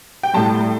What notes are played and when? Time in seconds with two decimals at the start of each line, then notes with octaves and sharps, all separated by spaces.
0.23 G5
0.33 A2 G3 A5